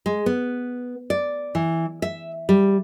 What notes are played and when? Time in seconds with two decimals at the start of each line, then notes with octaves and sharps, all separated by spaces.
0.06 G#3
0.26 B3
1.10 D5
1.55 E3
2.02 E5
2.49 G3